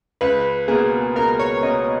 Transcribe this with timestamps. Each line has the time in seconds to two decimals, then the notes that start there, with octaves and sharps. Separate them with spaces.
0.21 C#2 B4
0.68 B2 A#3 G#4
1.15 C#2 A#4
1.39 C#5
1.63 B2 A#3 D#5